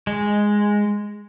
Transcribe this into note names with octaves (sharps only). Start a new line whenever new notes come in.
G#3